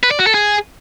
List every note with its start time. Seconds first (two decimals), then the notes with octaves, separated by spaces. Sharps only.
0.03 B4
0.11 D5
0.19 F#4
0.27 A4
0.34 G#4